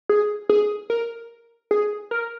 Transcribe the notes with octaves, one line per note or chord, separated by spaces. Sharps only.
G#4
G#4
A#4
G#4
A#4